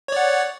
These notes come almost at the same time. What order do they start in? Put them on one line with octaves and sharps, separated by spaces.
C#5 D5 F#5